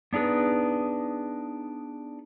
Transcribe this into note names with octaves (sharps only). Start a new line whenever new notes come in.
B3 D4 D#4 G#4 B4